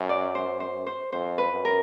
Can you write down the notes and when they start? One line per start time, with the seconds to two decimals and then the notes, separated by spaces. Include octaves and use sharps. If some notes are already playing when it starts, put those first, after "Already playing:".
Already playing: F#2
0.09 D5
0.35 C5
0.60 C5
0.86 C5
1.12 F2 C5
1.38 B4
1.52 F#2
1.65 A#4